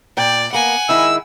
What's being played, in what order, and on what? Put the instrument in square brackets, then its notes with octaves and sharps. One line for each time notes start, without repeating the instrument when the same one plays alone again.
[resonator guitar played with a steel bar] A#2 G5 [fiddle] D5
[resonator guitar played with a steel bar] A#3 B3 [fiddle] F#5 G#5
[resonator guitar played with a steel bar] D#3 G#3 E4 [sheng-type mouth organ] E6